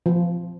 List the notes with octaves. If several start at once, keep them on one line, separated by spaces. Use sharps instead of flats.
F3